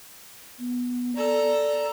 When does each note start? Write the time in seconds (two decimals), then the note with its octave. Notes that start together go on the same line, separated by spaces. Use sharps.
0.59 B3
1.16 A4 D5 A#5